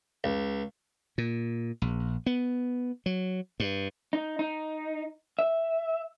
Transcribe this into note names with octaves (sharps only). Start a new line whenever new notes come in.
C#2
A#2
A#1
B3
F#3
G2
D#4
D#4
E5